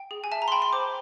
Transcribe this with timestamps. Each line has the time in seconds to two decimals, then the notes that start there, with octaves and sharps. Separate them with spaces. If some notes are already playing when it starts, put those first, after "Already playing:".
Already playing: G5
0.11 G#4
0.24 G#5
0.32 E5 A5
0.42 A#5
0.48 C6
0.52 G5 B5
0.62 C6
0.73 C5 D6